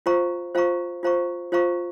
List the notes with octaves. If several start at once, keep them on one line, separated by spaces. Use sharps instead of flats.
F4 C5 F5 A#5 C#6
F4 C5 F5 A#5 C#6
F4 C5 F5 A#5 C#6
F4 C5 F5 A#5 C#6